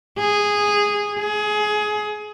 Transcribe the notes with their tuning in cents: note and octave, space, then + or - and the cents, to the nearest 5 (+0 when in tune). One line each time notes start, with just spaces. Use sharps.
G#4 -10
G#4 +20